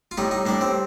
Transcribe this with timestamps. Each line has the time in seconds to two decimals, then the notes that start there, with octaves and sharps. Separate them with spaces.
0.11 F4
0.17 A2 G3 D#4
0.31 D#4
0.46 A2 G3 D4
0.61 C4